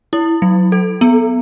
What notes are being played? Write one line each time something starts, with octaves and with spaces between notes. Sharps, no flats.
E4
F#3
A4
B3